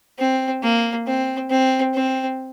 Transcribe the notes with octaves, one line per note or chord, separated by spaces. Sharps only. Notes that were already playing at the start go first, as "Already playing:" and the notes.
C4
A#3
C4
C4
C4